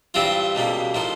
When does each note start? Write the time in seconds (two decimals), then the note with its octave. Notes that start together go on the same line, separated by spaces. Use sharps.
0.14 G2 E3 G3 C4 F4
0.55 C#2 B2 G3 A#3
0.94 A2 F3 A#3 D#4